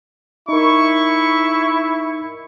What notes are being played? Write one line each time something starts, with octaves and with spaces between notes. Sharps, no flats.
D#4 E4 A#4 C#6